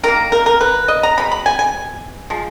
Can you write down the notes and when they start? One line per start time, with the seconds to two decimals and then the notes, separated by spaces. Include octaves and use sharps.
0.03 D#3 A#3 A#4
0.32 A#4
0.46 A#4
0.61 B4
0.88 D#5
1.03 A#5
1.18 B2 G#3 B3 B5
1.32 B5
1.46 G#5
1.59 G#5
2.30 F3 G#3